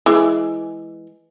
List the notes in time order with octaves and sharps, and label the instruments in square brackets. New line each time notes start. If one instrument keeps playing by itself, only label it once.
[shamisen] E3 G#3